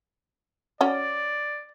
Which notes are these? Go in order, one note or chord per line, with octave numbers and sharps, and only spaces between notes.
C#4 F#4 D5